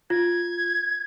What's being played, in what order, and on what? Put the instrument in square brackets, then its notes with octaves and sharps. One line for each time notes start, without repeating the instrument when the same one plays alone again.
[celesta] F4 [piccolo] G#6